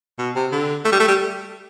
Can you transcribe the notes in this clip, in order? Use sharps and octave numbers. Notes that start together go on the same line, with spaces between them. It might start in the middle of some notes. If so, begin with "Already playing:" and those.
B2
C3
D3
A3
G3
A3
G3